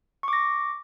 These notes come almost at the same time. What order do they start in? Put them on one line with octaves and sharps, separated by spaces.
C#6 D6 A#6